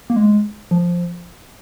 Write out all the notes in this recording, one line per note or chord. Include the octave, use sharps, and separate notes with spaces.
A#3
G#3
F3